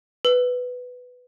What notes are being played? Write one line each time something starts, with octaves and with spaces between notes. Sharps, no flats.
B4